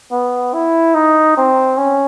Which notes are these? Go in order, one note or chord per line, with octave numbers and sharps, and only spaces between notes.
B3
E4
D#4
C4
C#4